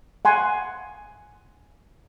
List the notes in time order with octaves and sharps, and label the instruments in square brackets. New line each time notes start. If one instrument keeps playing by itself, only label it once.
[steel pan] F#5 G#5 C6